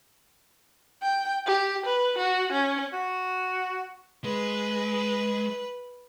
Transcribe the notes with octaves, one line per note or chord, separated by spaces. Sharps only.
G5
G4
B4
F#4
C#4
F#4
G#3 B4